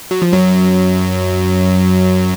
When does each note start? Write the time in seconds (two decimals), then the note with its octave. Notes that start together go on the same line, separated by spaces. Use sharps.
0.11 F#3
0.22 F3
0.33 F#2 F#3